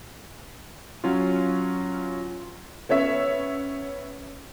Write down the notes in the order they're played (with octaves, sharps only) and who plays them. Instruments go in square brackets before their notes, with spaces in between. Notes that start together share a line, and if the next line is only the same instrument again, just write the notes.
[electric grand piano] F#3 C#4 F4
[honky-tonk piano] B3 C#4 C#5 E5